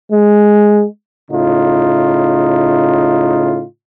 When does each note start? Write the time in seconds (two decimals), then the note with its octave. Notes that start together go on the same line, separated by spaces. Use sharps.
0.12 G#3
1.31 A2 C#3 D#4 F4